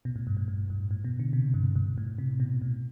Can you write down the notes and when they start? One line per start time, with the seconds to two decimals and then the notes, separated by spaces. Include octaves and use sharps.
0.05 B2
0.16 A2
0.27 G2
0.37 A2
0.48 A2
0.70 G2
0.91 A2
1.04 B2
1.19 D3
1.33 C3
1.54 G2
1.76 G2
1.98 A2
2.18 C3
2.40 B2
2.62 A2